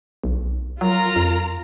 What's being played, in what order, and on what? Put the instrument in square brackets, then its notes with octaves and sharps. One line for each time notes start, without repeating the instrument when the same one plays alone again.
[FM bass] B1
[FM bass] F#3 [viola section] F4 A#4 A#5
[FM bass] F2